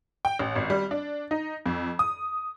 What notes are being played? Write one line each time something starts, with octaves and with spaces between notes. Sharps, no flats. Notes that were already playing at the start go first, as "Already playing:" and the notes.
G5
A1
G#1
G3
D4
D#4
F2
D#6